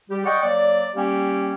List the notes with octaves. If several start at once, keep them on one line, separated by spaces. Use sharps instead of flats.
G3 G4
D5 D#5 F#5 G5 C#6
F#3 A#3 D5
G3 A#3 C#4 G4 G5